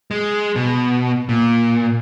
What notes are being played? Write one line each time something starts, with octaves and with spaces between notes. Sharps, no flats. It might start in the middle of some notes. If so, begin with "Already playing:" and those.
G#3
B2
A#2